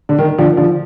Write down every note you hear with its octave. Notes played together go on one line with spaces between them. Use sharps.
D3
D#3
D3 F3
D3 F3